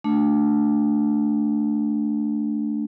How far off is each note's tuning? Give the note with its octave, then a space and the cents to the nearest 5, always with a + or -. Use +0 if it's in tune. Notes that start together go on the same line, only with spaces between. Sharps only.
A3 +0 D4 +0